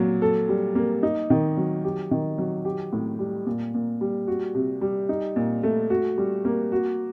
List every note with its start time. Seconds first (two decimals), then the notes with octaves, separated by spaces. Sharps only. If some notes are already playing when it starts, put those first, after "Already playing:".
Already playing: A#2 F#3
0.22 A4
0.49 G3
0.75 A#3
1.03 D#4
1.30 D#3
1.57 F#3
1.84 G4
2.11 D#3
2.38 F#3
2.65 G4
2.93 A2
3.19 G3
3.46 A#2
3.74 A#2
4.01 G3
4.27 F#4
4.55 C3
4.81 G3
5.09 D#4
5.36 A#2
5.63 A3
5.90 F#4
6.18 G3
6.45 A#3
6.72 F#4